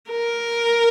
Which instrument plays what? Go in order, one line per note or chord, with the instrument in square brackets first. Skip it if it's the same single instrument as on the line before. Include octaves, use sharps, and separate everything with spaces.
[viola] A#4